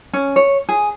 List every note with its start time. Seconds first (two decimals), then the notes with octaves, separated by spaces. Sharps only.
0.13 C#4
0.36 C#5
0.69 G#4